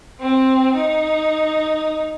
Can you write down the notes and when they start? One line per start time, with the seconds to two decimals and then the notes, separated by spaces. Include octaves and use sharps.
0.20 C4
0.76 D#4